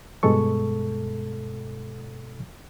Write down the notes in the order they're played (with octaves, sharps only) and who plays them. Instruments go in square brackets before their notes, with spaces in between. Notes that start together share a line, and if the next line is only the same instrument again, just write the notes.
[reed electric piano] G2 B2 G#3 A4 C#6